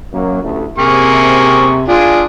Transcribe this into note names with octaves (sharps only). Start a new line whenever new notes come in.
F#2 F#3 A#3
A1 D2 A3
C3 A#3 G#4 C#6
D4 F4 G#4